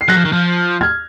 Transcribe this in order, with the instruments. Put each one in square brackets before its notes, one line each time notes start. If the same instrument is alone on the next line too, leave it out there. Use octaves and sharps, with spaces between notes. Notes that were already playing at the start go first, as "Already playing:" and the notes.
[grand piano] C7
[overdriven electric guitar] F#3 [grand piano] F#6 A#6
[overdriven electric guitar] F3
D#3
F3
[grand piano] F6 G#6